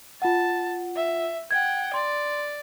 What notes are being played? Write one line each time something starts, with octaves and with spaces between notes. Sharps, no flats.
F4 F#5 A5
E5
F#5 G5 G#6
D5 C6